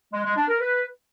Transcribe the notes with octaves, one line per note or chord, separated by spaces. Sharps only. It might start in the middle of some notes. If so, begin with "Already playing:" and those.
G#3
G#3
D4
A#4
B4